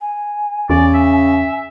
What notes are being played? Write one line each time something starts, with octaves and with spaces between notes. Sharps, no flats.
G#5
E2 C#3 D5
E5